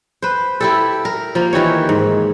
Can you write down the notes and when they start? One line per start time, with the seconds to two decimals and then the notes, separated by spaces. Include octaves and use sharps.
0.22 B4 C5
0.61 E4 G4 A4
1.05 A#4
1.35 F3 A#3
1.53 D#3 E3 G4 C#5
1.89 G#2